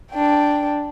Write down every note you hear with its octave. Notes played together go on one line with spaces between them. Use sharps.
D4 G5